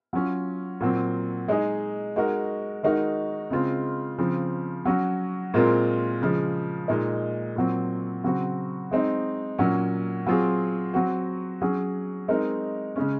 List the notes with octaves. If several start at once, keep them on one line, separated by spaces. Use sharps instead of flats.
F#3 C#4 F4
A#2 F#3 C4
G#3 D#4 G#4
G#3 D#4 F#4 A#4
D#3 G#3 D#4 F#4 A#4
C#3 G#3 C4 F4
C#3 F3 C4
F#3 C#4 F#4
A#2 G#3 C4 F4 A#4
C#3 F3 G#3
A#2 G#3 D#4
A#2 F#3 C4
C#3 F#3 C4 F#4
G#3 C4 D#4
A#2 F#3 C#4
F#3 C4 F4 G#4
F#3 C4 F#4
F#3 C#4 G#4
G#3 C4 D#4 A#4
C#3 G#3 C#4